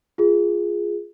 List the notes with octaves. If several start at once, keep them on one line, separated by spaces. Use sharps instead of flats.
F4 G#4